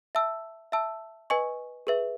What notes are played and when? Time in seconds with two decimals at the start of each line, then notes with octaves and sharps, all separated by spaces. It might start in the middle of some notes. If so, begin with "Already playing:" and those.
0.15 E5 A5 E6
0.72 E5 A5 E6
1.30 B4 D#5 G#5 C#6
1.87 G#4 B4 E5